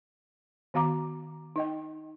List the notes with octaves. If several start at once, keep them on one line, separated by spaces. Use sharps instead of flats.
D#3 B3 F#4 F5 A#5 D6
D#4 D#5 G5